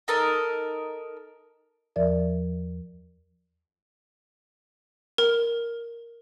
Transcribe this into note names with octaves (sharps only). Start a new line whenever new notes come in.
D#4 A4 A#4 D#5
E2 F3 A#4 D5 E5
A#4